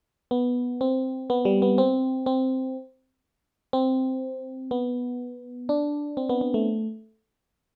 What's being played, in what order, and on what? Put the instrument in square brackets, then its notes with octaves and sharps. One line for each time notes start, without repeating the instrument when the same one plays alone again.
[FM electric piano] B3
C4
B3
G3
B3
C4
C4
C4
B3
D4
C4
B3
B3
A3